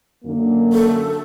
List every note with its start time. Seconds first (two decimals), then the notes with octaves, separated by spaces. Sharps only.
0.24 F#2 D3 A#3
0.73 A4